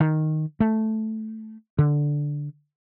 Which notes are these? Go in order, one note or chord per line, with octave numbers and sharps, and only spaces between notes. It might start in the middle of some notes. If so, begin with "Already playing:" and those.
D#3
A3
D3